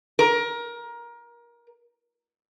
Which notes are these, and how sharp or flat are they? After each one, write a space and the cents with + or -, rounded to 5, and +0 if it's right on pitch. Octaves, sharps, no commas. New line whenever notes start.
A#4 +25